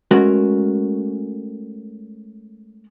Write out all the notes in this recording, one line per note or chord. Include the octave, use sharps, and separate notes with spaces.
G#3 A3 C#4 F#4 A#4